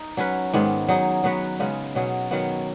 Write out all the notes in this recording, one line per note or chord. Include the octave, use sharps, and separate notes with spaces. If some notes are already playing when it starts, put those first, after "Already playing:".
Already playing: D#4
F#3 C#4 B4
G#2 D#3 B3
F#3 D#4 G#4
F#3 B3 F#4 B4
C#3 G#3 B3
B2 F#3 C#4 G#4
D#3 F#3 B3